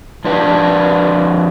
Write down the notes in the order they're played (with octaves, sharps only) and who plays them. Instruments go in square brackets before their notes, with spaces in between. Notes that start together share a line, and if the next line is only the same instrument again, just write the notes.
[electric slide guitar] F2 D4 B4 D5